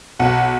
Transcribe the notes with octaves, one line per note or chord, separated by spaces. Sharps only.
B1 F#5